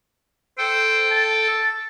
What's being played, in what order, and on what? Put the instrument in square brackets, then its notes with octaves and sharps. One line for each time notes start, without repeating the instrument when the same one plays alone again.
[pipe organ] A4 G5 [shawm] C5
[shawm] A5